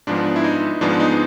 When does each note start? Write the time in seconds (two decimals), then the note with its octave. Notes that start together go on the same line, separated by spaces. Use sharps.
0.07 G#2 F3 G#3 B3 D4
0.36 E4
0.44 D#4
0.81 G#2 F3 G#3 B3 D4
1.00 D#4